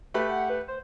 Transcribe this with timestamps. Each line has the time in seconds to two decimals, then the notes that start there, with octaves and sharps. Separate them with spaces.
0.14 A3 G4 B4 B5
0.30 F#5
0.50 B4
0.68 C5